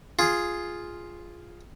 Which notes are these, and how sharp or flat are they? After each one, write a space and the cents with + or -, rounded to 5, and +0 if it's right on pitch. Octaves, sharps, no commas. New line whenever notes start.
F4 +0 G#4 +0